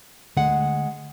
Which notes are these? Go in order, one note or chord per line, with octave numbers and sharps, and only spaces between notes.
D3 G#3 A3 F#5